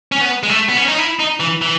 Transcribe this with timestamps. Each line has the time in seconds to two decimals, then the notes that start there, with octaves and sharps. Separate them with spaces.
0.12 C#4
0.21 B3
0.43 G#3
0.49 A3
0.69 B3
0.77 C#4
0.88 D#4
0.98 E4
1.20 D#4
1.40 E3
1.62 E3